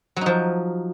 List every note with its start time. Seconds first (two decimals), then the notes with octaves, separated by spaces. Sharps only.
0.16 F#3
0.21 D#4
0.26 F3